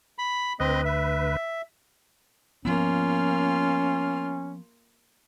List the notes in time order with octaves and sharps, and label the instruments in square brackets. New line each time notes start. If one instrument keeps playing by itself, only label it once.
[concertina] B5
[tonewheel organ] D2 B4 [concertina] C4 D#5
[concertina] E5
[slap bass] F3 B3 [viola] A#3 F4 [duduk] C#4